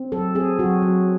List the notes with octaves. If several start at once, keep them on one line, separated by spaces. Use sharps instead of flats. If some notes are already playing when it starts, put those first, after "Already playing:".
Already playing: C4
F#3 A4
C4 G#4
F#3 F#4
F#3